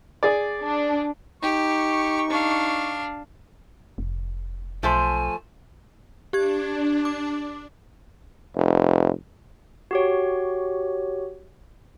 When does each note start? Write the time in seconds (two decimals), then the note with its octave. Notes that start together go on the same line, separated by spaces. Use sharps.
0.23 G#4 D5
0.63 D4
1.43 D#4 G4 C#6
2.30 D4 F5
3.98 F1
4.83 B1 F3 A3 C5 G#5
6.33 D4 G4 G#6
7.05 D6
8.55 F1
9.91 F#4 G4 C#5